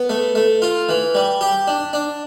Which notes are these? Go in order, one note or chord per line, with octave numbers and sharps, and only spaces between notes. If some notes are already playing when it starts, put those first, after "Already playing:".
Already playing: B3
A3
A3
F4
E3
G3
G4
D4
D4